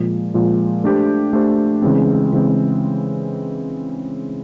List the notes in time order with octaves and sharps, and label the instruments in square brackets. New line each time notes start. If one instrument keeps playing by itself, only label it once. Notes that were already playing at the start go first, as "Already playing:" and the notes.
Already playing: [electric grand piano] A#2 F3 G#3
A#2 F3 G#3
A3 D4 G4 C5
A3 D4 G4 C5
C#3 E3 G#3 C4
C#3 E3 G#3 C4